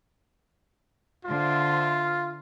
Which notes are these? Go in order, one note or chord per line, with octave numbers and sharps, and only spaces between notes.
D3 F4 C5 E5